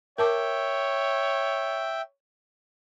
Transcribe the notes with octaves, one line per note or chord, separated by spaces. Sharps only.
A#4 C#5 E5 G5 A5 D6